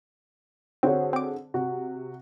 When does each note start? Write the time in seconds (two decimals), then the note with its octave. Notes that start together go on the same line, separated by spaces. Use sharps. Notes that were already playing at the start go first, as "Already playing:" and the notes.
0.83 D3 C4 F#4 G#4 C5 C#5
1.13 C4 D6
1.54 C3 F#4